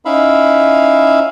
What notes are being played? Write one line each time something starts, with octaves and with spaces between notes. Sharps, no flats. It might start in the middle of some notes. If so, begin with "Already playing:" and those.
C#4 D#4 E4 E5 F5 B5